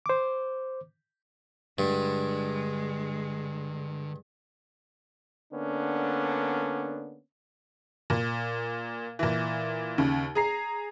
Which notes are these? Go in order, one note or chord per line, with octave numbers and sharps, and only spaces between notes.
C5 D6
G2 D3 G#3
D3 A#3 B3 C#4 D4
A#2
A#2 E3
D#2 C#3
G#4 A#5 C7